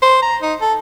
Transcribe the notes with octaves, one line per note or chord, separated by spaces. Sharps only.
C5
A#5
D#4
A4